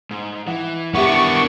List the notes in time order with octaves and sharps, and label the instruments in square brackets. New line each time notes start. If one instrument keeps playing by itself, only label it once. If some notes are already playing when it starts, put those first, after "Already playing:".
[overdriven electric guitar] G#2
[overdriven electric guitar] E3 [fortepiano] F#5
[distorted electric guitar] B3 D4 [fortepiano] E4 G4 [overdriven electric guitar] A#4 F#5 [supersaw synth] C#6